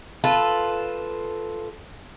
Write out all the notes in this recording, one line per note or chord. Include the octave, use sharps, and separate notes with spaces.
F4 A4 B4